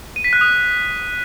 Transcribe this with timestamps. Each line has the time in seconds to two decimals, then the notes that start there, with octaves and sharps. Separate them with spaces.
0.16 D#7
0.24 B6
0.33 F#6
0.41 D#6